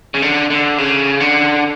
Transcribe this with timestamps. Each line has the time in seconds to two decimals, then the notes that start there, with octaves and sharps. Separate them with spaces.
0.14 C#3
0.22 D3
0.50 D3
0.78 C#3
1.20 D3